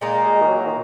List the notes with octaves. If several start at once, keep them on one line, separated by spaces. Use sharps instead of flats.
A#2 G#3 A#3 D#4
G#3
D#3
F#3
D#3